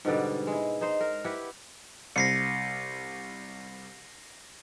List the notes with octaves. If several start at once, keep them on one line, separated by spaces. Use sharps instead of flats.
G#2 B2 D3 G3
G#3 E4
D#4 C5
A#4
E4 G4 B4 F#5
C2 A#6 C7 C#7